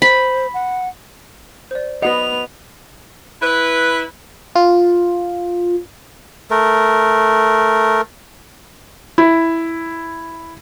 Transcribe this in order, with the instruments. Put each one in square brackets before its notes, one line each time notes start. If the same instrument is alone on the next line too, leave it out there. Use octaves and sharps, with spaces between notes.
[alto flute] C5 [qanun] B5
[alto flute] F#5
[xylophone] C5 D5
[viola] B3 [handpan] F#4 D#5 [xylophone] F#5 B5 [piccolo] F7
[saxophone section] E4 B4
[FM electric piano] F4
[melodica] A3 A#4
[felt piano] E4